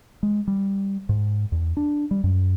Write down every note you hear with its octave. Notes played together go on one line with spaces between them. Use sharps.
G#3
G3
G#2
E2
D4
G3
F#2